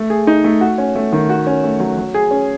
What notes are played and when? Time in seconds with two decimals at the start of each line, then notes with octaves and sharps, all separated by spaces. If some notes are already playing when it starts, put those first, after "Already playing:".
Already playing: A3
0.10 G#4
0.27 D#4
0.44 A3
0.61 F#4
0.78 C#4
0.96 A3
1.12 D#3
1.29 F#4
1.47 C#4
1.64 A3
1.80 F#3
1.98 F#3
2.14 G#4
2.31 C#4